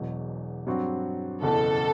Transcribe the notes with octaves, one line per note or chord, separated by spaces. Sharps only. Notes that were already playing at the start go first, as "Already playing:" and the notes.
Already playing: E1 E2 B2 F#3
G2 F#3 C4 F#4
F#1 E2 B2 A4